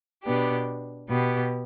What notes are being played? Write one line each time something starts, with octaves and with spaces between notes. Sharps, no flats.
B2 B3 D4 G4
B2 B3 G4